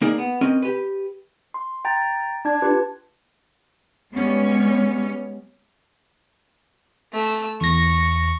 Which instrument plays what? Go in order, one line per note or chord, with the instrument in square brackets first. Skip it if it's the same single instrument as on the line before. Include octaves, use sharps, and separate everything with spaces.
[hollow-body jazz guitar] A#3 D#4 G#4 A#4 D5
B3
C4 C#4 A#4 D#5
G4 B4
[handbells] C6
G5 A#5 A6
[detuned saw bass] D4 [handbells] A5 G#6
[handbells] F4 G4 B4
[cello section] G3 G#3 B3 C#4
[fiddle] A3 E6
[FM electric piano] E2 A#6 [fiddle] C#6